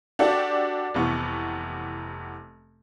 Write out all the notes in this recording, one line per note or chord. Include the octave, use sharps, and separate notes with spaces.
D4 F#4 G4 A4 D5 F#5
F1 C3 E3 B3 C#6